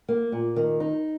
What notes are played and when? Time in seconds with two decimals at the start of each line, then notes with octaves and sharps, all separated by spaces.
0.08 A#3
0.32 A#2
0.56 D#3
0.80 D#4